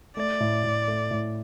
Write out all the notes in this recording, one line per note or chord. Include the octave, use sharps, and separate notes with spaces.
A3 D5
A2
A2
A3
A2